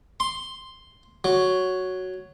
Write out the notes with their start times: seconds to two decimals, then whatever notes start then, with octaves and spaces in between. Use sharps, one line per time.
0.20 C6
1.24 F#3